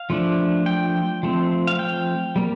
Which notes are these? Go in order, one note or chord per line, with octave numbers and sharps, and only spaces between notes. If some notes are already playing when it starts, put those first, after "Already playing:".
Already playing: F5
F3 A3 D4
G5
F3 A3 C4
F5
G5
G3 A#3